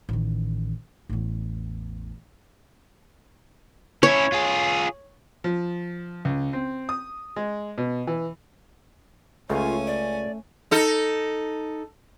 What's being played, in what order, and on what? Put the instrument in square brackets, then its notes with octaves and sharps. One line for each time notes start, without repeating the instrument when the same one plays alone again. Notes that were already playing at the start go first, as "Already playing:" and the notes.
[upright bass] A1 D#3
A1 E2
[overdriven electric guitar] C#4 E4 [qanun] C#5
[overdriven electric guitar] F4 G#4
[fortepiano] F3
C#2
C4
D#6
G#3
B2
E3
[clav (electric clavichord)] C#2 C#3 [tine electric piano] A3 [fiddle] C#4 G#5 [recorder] F4
[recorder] D5
[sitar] D#4 A4